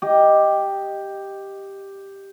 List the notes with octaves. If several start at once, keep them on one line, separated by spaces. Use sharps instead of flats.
G4 D#5